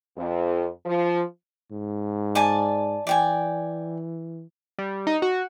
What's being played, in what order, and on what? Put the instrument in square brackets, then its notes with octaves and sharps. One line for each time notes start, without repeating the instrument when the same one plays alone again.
[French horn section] F2
F3
[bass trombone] G#2
[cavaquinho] D5 G#5 A5
[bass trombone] E3 [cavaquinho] D5 G5 G#5
[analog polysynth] G3
D#4
F#4